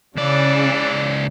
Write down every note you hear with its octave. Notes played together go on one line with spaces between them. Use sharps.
C#2 C#3 E3 D4 D5